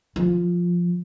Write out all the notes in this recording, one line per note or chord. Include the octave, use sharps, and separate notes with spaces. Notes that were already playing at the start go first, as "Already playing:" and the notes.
F3